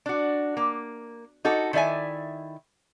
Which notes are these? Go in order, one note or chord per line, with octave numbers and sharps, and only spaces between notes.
D4 F#4
A#3
D#4 F#4 A4
D#3 E4 D5 E5 G#5